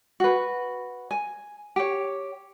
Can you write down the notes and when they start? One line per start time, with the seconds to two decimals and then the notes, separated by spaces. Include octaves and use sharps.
0.20 F#4 B4
1.11 G#5
1.76 G4 C#5